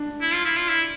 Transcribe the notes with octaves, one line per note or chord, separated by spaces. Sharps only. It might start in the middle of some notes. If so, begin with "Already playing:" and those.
Already playing: D4
E4
F4
E4
F4
E4